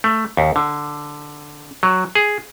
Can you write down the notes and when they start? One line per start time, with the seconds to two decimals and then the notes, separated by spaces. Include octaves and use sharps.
0.04 A3
0.37 D#2
0.56 D3
1.83 F#3
2.15 G#4